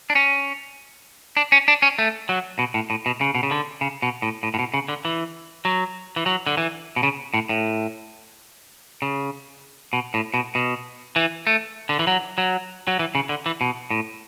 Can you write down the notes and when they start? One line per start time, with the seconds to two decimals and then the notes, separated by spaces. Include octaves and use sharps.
0.10 D4
0.15 C#4
1.37 D4
1.52 C#4
1.68 D4
1.82 C#4
1.99 A3
2.29 F#3
2.59 B2
2.74 A2
2.90 A2
3.06 B2
3.21 C#3
3.35 B2
3.43 C#3
3.51 D3
3.81 C#3
4.02 B2
4.22 A2
4.43 A2
4.54 A2
4.59 B2
4.74 C#3
4.88 D3
5.05 E3
5.65 F#3
6.16 E3
6.26 F#3
6.47 D3
6.57 E3
6.96 B2
7.03 C#3
7.34 A2
7.49 A2
9.02 C#3
9.93 B2
10.14 A2
10.34 B2
10.55 B2
11.16 E3
11.47 A3
11.89 D3
11.99 E3
12.07 F#3
12.38 F#3
12.87 F#3
12.99 E3
13.15 C#3
13.29 D3
13.46 E3
13.61 B2
13.90 A2